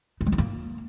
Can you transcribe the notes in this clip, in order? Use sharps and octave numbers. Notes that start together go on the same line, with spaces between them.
D#4
G#3
D#4
A#3